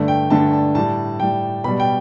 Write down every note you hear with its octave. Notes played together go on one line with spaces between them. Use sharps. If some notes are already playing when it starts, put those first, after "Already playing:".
Already playing: G2 D3 A3
G5
G2 D3 A3 A5
A5
A2 G3 A5
A2 G3 G5
B2 G3 B5
G5